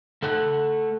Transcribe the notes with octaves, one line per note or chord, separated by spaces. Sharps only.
A3 A4 F#5